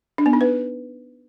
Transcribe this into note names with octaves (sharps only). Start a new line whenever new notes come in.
D4
B3
D#4
B4